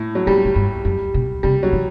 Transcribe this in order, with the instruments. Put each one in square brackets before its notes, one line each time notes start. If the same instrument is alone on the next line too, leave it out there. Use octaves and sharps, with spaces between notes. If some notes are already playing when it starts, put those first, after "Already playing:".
Already playing: [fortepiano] A2
F#3
[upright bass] A2 [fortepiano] G3
[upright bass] A2
G2
F#2
B2
[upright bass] C3 [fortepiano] G3
[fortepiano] F#3
[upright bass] E3